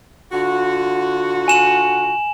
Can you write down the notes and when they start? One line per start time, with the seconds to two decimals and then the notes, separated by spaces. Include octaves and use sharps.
0.32 D3 F4 F#4
1.48 G#5 E7 F#7